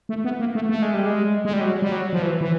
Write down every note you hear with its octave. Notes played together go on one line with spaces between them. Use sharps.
A3
B3
A#3
A3
A3
G#3
G3
G#3
G#3
G3
F#3
G3
F#3
F3
E3
E3